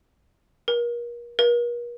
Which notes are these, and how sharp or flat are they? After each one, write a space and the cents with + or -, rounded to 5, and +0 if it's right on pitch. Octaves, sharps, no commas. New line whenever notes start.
A#4 +35
A#4 +45